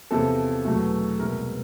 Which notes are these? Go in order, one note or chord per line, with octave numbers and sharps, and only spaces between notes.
E2 C3 F3 A4
E2 B2 F#3 A3
C2 B2 G#3 A#4